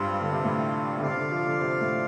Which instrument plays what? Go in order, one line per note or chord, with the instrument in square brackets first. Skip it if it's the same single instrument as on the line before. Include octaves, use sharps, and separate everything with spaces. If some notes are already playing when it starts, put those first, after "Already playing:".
Already playing: [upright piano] G2 [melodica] G3 C4 F4
[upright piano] D3
C3
A2
D3
[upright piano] C3 [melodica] F4 D5 F5
[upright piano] D3
F3
D3
C3
A2